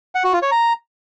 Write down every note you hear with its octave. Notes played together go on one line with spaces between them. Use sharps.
F#5
F#4
F4
C#5
A#5